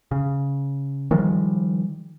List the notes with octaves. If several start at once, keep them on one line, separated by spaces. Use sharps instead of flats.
C#3
D#3 F3 G3 G#3